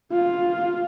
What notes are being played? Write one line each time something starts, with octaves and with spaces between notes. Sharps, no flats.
F4